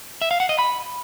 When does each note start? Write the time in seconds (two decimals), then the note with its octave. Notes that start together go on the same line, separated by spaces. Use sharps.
0.22 E5
0.31 F5
0.40 F#5
0.49 D#5
0.59 B5